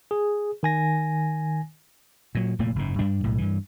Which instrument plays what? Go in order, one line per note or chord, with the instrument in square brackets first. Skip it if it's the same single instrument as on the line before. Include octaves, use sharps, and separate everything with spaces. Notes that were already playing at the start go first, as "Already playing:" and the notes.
[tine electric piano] G#4
D#3 G#5 A#6
[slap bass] A#2 F#3
F1 A#2 A3 A#3
F#1 G#2
G2 G3 D4
B1 A2
G2 E3